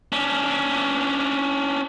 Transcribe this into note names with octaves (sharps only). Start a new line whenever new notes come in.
C#4 D4